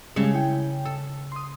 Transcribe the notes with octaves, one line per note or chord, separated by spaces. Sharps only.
C#3 G3 G#3 E5 A5 C#7
E4 G5
A4
C6 D#6